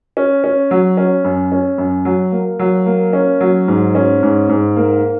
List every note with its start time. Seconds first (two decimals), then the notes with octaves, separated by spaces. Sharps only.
0.17 C#4
0.44 C#4
0.71 F#3
0.97 C#4
1.24 F#2
1.52 C#4
1.78 F#2
2.05 F#3
2.32 A#3
2.59 F#3
2.86 A#3
3.13 C#4
3.41 F#3
3.68 G#2
3.95 C#4
4.23 G#2
4.49 G#2
4.76 A#3